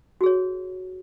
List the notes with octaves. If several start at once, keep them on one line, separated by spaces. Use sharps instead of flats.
F#4 G#4 C#5